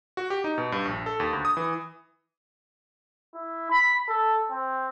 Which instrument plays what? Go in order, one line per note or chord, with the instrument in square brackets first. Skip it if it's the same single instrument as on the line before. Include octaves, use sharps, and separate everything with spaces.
[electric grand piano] F#4
G4
D#4
B2
G2
A#1
A4
D#2
D2
D#6
E3
[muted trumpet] E4
B5
A4
C4